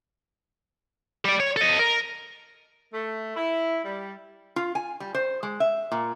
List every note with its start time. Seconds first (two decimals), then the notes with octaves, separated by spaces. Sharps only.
1.25 G3 D5
1.40 C#5
1.56 A4 D#5
1.79 A#4
2.94 A3
3.37 E4
3.85 G3
4.56 F4
4.75 G#5
5.00 G3
5.14 C5
5.43 G#3
5.60 E5
5.92 A#2